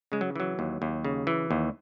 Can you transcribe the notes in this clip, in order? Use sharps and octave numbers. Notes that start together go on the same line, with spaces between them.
C#3 G#3
F#3
E3 F#3
D#2
D#2
C#3
E3
D#2